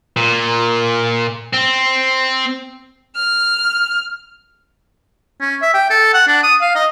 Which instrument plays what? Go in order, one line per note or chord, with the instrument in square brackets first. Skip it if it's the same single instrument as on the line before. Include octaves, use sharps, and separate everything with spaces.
[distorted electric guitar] A#2
C4
[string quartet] F6
[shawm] C#4
E5
G5
A4
F#5
D4
D#6
F5
D#5